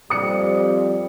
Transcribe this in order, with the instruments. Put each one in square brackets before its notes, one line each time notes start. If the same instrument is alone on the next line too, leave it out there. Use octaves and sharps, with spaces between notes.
[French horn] F2 [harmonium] G3 [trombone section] C4 G4 [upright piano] D#6 C#7